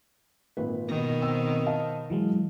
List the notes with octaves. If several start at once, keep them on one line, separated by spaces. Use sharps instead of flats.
G#1 A#2 B4
B2 D#3 A#6
C4 E6
D#5 F5 A5
E3 F#3 G#3